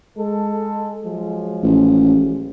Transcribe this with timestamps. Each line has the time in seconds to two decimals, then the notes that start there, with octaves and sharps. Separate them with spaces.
0.17 G#3 A4
1.05 F3 F#3 G#3
1.63 A1